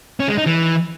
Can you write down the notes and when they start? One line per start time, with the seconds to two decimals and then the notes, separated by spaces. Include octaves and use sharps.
0.20 C#4
0.29 G#3
0.38 D#4
0.46 E3